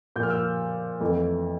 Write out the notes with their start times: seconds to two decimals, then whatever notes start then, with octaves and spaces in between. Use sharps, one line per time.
0.16 A#2 F3 A#3 G6
0.23 F6
0.30 E6
0.37 F6
1.00 F2 E3 A3